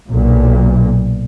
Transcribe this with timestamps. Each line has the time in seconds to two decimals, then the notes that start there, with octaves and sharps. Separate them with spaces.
0.11 B1 A#2